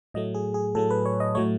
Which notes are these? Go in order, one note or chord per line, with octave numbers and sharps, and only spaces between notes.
A2 F#3 A3 D#5
G#4
G#4
A2 F#3 A3 A4
B4
C#5
D#5
A2 F#3 A3 C#5